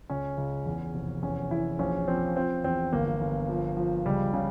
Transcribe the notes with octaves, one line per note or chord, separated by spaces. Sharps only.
C#2 C#4
C#2
E2
F1
E2 C#4
E2 E4
A#1 C#4
F3 C4
F3 C4
E2 C4
G1 A#3
G1
F3
F3
C#2 G3
C#3